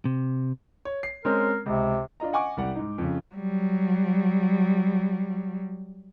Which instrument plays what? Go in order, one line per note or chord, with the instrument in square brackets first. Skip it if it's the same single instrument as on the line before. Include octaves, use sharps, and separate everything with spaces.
[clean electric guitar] C3
[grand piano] C#5
C7
[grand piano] G#3 C4 C#4 [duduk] A#4
[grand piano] C#2 [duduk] C3
[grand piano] D4 F4 D#5 A#5
D#5 F#5 G#5 C#6 D6
C2 G3 F#5
G#2 D#4
F2 C#3
[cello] F#3 G3